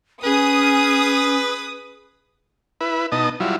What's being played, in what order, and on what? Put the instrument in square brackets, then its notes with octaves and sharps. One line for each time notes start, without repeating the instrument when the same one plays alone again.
[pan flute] C#4 [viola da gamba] G#4 [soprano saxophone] B4 [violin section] D#6
[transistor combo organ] E4 B4
B2 D#4 D#5 A5
F#3 G3 E4 F4